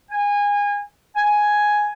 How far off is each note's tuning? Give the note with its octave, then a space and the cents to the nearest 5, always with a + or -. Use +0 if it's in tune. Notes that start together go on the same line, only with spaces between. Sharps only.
G#5 -25
G#5 +5